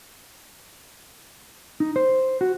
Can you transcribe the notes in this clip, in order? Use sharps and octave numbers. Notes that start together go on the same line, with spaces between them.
D#4
C5
F#4